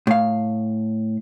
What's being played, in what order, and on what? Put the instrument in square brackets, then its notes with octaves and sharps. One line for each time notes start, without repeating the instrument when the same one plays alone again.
[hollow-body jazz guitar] A2 F5